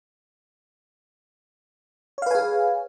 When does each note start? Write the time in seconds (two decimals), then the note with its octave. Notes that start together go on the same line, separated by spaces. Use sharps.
2.18 C#5
2.22 F5
2.26 B4
2.31 G#5
2.35 G#4